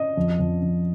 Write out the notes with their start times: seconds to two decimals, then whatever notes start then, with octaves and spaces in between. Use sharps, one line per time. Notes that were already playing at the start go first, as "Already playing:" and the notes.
Already playing: D#5
0.17 F2
0.40 F2
0.62 F2